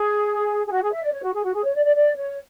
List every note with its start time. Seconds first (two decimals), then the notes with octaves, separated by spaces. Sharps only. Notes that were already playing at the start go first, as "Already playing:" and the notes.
Already playing: G#4
0.67 G#4
0.71 F#4
0.82 G#4
0.92 E5
1.03 D5
1.13 C#5
1.23 F#4
1.33 G#4
1.44 F#4
1.54 G#4
1.64 C#5
1.75 D5
1.85 D5
1.96 D5
2.16 C#5